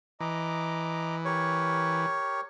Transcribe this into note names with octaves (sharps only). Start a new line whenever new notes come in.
E3 D#5 A#5 D6
G4 A#4 C#5